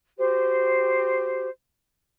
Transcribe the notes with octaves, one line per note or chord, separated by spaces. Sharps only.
F#4 G4 C5